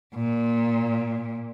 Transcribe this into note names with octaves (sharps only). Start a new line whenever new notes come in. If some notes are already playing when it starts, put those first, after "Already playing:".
A#2